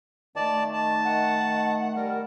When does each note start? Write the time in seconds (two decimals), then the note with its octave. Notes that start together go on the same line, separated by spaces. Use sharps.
0.36 D#3 A3 D5 A5
0.73 A5
1.04 F#5
1.96 G3 A#4